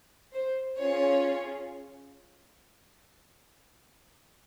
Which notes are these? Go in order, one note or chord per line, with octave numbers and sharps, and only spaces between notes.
C5
C#4 F4 G#4 C#5